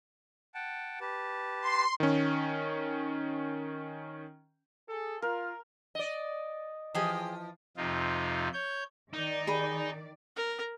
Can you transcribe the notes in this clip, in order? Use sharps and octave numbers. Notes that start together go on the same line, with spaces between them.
F#5 G5 A5
G4 B4 A5
C6
D#3 C#4
G#4 A4
F4 A#4
D5 D#5
E3 F3 G4 G#4 D#5
F2 C3 D#4 F4
C#5 G6
D#3 D#4 D5
G#4 B5
A#4